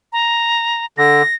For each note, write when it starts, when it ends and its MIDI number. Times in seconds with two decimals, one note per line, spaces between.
0.13 0.85 82
0.98 1.22 50
0.98 1.35 94